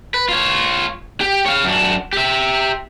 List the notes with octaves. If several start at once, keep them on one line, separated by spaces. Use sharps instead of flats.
B4
F4 C#5
G4
C#5 F5
F#2 D4
G4 E5